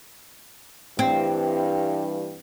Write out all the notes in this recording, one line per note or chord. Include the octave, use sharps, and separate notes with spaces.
G2 E3 C4